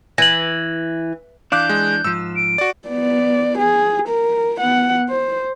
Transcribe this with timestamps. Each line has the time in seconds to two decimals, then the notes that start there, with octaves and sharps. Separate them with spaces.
0.18 E3 A#6 F#7
1.52 E3 D4 F5 D6 F#6 G6
1.69 G#3
2.04 G#2 F3 E6
2.36 D7
2.58 F#4 D5
2.88 B3 D5
3.58 G#4
4.08 A#4
4.58 B3 F#5
5.09 C5